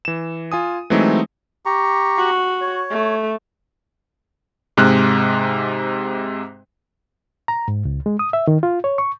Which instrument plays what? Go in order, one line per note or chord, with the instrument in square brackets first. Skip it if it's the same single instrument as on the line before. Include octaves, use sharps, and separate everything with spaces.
[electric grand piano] E3 E7
F4 G#5 D#6
E3 F#3 G#3 A3 C4 D#4
[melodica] G4 A#5 C#6
[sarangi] F#4
[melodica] C#5
[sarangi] A3
[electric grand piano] G#2 C3 G#3 F6 F#6
[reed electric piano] A#5
G#2
C#2
G#3
D#6
E5
D#3
F4
C#5
C#6